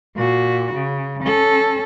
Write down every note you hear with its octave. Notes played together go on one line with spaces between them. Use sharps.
A#2 F#4
C#3
C#4 A4